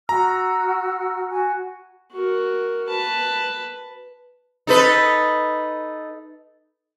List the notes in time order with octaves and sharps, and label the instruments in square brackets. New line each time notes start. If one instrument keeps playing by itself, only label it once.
[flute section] F#4 E6 F6 [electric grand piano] A#5
[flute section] F#4 G#5
[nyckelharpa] F#4 A#4
B4 A5
[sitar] D#4 A4 B4